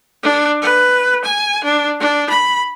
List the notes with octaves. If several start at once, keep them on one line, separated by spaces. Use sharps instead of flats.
D4
B4
G#5
D4
D4
B5